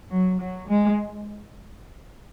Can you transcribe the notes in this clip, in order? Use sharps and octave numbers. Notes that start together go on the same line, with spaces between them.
F#3
F#3
G#3